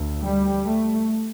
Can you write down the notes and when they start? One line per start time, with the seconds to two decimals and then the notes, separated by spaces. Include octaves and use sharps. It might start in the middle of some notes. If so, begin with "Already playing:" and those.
Already playing: D2
0.22 G3
0.67 A3